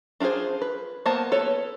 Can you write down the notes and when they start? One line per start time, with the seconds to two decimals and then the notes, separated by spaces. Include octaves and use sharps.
0.20 D4 F4 F#4 G#4 C5
0.62 B4
1.06 A#3 B3 C5 A5
1.32 A4 B4 C#5